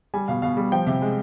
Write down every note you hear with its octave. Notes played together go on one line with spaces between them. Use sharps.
G3 G#5
B2 F5
B2 F5
G3
F3 G5
C3
G#3